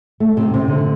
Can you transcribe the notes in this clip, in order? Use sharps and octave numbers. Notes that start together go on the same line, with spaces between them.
A3
C3
C3
D3